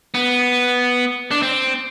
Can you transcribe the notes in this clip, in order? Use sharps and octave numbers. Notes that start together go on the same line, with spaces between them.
B3
D4
C4